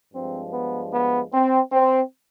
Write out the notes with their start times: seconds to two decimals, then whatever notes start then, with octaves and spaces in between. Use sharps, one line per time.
0.14 G2 F3 G#3 C4
0.53 B3
0.93 B3
1.33 C4
1.72 C4